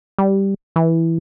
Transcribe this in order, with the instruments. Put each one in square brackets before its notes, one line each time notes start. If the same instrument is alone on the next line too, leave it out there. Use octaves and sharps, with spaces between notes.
[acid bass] G3
E3